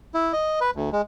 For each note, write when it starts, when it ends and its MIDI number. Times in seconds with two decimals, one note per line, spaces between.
0.14 0.32 64
0.33 0.59 75
0.61 0.71 71
0.76 0.90 38
0.93 1.01 56